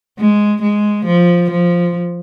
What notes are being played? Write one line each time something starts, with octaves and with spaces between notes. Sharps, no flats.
G#3
G#3
F3
F3